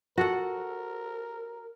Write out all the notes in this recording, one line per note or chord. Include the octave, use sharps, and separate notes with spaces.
F#4 A4 A#4 F#5